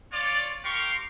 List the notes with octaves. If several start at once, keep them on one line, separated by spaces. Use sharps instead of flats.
F4 C#5 D5
G4 A#4 F5 C6 C#6